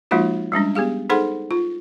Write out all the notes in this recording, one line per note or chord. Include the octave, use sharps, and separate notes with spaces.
F3 G#3 A#3 D#4 F4 F#4
G3 G#3 C#4 D4
B3 G4 G#4 F5
D#4 G#4 A4 C5 F#5 C6
F4